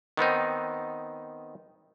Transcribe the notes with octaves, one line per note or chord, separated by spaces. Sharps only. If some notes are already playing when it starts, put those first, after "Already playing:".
D#3 B3 C4 D#4